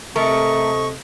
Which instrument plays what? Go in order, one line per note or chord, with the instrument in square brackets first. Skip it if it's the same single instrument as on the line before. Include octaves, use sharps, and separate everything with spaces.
[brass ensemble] C3 A4 D#5 [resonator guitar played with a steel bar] A3 A#4 [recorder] C#6